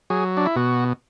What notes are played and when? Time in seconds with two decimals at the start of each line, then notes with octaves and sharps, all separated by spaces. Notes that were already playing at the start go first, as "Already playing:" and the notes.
0.10 F#3 G#4
0.37 D4
0.46 E4
0.56 B2 F#4